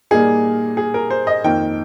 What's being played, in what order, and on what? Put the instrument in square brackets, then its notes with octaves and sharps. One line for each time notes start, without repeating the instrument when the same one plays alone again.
[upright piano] A#2 G3 A#3 D#4 G#4
G#4
A#4
C5
D#5
F2 D#3 A#3 D#4 G5